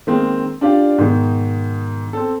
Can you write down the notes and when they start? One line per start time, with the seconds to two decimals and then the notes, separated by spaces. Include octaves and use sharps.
0.07 D#3 G#3 A#3 C4
0.61 D4 F4 G4 D5 F5
0.98 G#2 B2 D#3
2.13 C4 A4